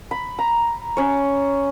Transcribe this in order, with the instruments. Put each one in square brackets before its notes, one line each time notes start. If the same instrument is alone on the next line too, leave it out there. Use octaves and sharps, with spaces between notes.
[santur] B5
A#5
C#4 C#5